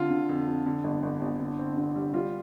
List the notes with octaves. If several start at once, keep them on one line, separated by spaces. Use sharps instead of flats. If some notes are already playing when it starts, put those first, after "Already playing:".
Already playing: D3 F4
D3
F2
F2
D3
G1
G1
G1
D3
C4
D3
G3
G3 F4